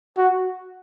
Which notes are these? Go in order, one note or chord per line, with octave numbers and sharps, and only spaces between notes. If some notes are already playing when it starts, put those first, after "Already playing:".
F#4